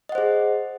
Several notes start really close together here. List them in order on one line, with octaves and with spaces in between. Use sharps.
D#5 F#5 C5 G#4